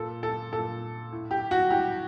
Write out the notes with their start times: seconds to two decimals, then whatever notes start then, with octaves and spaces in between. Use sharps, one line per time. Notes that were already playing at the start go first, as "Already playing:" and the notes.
Already playing: A#2 A4
0.23 A4
0.52 A#2 A4
1.12 A2
1.31 G4
1.51 F#4
1.70 A2 G4